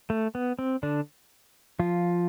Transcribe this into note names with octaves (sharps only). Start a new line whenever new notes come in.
A3
B3
C4
D3 D4
F3 F4